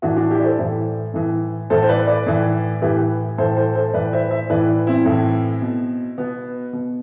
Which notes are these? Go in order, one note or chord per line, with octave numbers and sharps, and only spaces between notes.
A2 E3 D4 F#4
D4 F#4
E4 G4
D5
A4 C5
A2 E3
A2 E3
A2 E3 A4 C5
C5
B4 D5
B4 D5
A2 E3
A2 E3 G4 B4
A2 E3 A4 C5
A4 C5
A4 C5
A2 E3 B4 D5
C5 E5
C5 E5
A2 E3 B4 D5
C4 E4
A2 E3
B2
B2 B3
B2